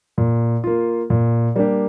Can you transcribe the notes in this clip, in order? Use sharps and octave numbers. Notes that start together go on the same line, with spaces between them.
A#2
A#3 F4
A#2
G3 A#3 D4 G4